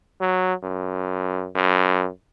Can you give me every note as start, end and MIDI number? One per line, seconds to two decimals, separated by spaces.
0.21 0.54 54
0.63 1.49 42
1.55 2.09 42